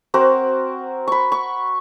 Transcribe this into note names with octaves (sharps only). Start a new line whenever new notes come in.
C4 F#4 A#4
B5 C#6
C#6